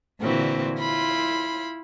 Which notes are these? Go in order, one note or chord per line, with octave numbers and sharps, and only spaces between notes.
A#2 D3 E3 C4 F#4
E4 F4 B5 C6